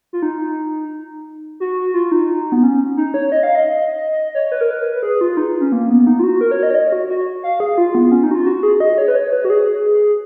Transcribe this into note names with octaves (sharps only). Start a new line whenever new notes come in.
F4
D#4
F#4
F4
D#4
B3
C#4
D#4
C#5
D#5
F5
D#5
C#5
B4
A#4
B4
G#4
F4
D#4
C#4
A#3
B3
D#4
F4
F#4
A#4
C#5
D#5
C#5
D#5
F#4
F#4
F5
G#4
F4
B3
C#4
D#4
F#4
F4
F#4
G#4
D#5
C#5
B4
C#5
B4
F#4
G#4